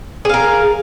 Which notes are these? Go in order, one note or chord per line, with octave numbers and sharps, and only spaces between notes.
G#4 A#4 F5